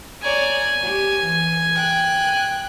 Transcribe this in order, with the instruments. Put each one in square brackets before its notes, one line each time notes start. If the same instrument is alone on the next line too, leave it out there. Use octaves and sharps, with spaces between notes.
[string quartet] C#5 D5 A#5 [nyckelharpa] G#5
[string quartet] G4 C#5
E3
G5 F#6